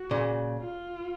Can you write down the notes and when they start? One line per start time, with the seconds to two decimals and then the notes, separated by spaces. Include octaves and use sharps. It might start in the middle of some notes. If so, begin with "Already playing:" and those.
Already playing: F#4
0.11 A#2 C#3
0.61 F4